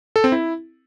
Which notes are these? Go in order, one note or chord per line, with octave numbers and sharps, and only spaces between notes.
A4
C4
E4